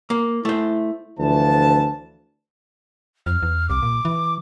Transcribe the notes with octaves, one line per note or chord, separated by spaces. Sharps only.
A#3
A3 E4 C5
D2 E3 F3 A5
F2 F6
E2
C2 D6
A#2
E3